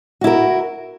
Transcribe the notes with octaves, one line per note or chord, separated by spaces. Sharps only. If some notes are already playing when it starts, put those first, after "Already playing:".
E4 F#4 A#4